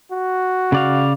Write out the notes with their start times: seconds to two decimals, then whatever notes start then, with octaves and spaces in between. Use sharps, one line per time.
0.12 F#4
0.72 C#3 D5 F5